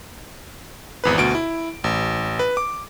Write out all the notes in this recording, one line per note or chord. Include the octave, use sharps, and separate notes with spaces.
G#1 E2 B4
D2 B2 D7
E4
A1
B4
D6